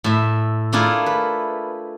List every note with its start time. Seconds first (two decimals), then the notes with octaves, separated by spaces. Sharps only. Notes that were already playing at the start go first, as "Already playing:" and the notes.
0.04 A2 E5
0.73 A3 D4 E4 F4 G#4 A#4
1.06 B4